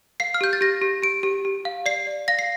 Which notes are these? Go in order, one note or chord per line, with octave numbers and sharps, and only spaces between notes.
F5 C7
F6
G4 G6
A6
G4 A#6
G4
G4 D7
G4
G4
F5
D5 C7
D5
F5 A#6
C7